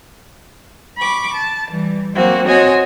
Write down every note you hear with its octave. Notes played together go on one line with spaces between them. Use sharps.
B5 C#6 D6
A5
E3 G3
F#3 A#3 C4 F#4
C4 F#4 C#5 D#5 G#5